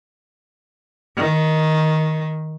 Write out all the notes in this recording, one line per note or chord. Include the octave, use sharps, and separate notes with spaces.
D#3